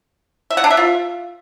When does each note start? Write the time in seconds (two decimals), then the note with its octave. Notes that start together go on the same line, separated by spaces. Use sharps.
0.50 E5
0.57 F#5
0.64 D4
0.70 E5
0.77 F4